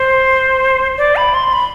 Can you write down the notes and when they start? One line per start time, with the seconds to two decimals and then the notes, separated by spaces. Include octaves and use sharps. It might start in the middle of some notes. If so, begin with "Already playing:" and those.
Already playing: C5
0.98 D5
1.16 B5
1.34 C6
1.52 B5